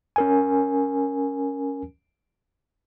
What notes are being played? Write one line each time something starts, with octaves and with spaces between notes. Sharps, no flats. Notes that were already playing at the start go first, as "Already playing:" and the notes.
C#4 A#4 G#5